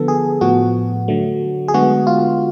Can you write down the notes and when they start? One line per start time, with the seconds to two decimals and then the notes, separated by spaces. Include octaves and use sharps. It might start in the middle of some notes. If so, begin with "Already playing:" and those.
Already playing: D3 F3 B3 A4
0.08 G#4
0.41 A2 F3 B3 F#4
1.08 D3 F#3 A3
1.68 G#4
1.74 D3 G#3 B3 F#4
2.07 F4